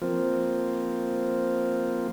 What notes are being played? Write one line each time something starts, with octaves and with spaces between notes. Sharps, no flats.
F3 A#3 C4 F4